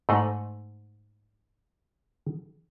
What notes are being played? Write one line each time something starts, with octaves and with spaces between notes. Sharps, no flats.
G#2 A3 C5 D#5 F#5 A#5